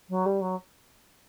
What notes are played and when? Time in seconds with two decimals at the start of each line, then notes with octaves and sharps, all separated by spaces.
0.09 F#3
0.26 G3
0.41 F#3